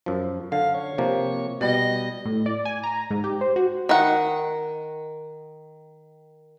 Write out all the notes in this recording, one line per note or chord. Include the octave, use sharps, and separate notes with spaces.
F#2 F3
D3 F5
C#5
C3 F3 A#3
B2 G3 D#5
A2
D5
G#5
A#5
G#2
G4
C5
F#4
D#3 F#5